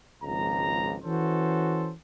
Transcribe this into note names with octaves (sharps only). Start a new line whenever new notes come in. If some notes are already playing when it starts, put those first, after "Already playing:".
G#1 C#2 F3 A#5
E3 C#4 F#4 A4 C5